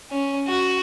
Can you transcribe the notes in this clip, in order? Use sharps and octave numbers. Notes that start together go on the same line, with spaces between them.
C#4
F#4